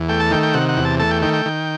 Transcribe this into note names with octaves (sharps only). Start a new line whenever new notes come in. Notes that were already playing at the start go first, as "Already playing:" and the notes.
Already playing: E2
A3 G5
A5
D#3 G5
G5
C3 F#5
F#5
E2
A5
A3 A5
G5
D#3 G5
G5
D#3